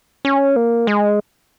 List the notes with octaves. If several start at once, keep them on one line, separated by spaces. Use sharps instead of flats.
C#4
A#3
G#3